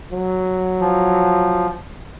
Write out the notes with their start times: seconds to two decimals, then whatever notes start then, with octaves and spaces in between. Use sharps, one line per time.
0.12 F#3
0.80 F3